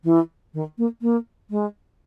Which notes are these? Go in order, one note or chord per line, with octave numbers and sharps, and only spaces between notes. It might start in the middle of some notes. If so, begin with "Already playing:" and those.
E3
D#3
A#3
A#3
G#3